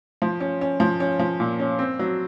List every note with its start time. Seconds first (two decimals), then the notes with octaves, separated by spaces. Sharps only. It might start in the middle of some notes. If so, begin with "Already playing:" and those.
0.22 F3
0.40 C#4
0.61 C#4
0.80 F3
1.00 C#4
1.19 F3
1.40 A#2
1.59 C#4
1.79 C4
1.99 F#3